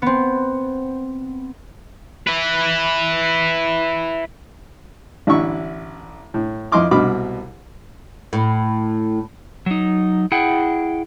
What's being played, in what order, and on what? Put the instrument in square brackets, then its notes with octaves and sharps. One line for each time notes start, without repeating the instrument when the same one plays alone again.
[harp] B3 C4
[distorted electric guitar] E4 B4
[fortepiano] A1 D3 D4 E4 E5 C#6
A2
F2 E4 D#5 C6 D6 F6
C2 B2 D#5 B5 D6 F6
[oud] A2
[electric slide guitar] F#3 D#4
E4 G#4 F#5 G5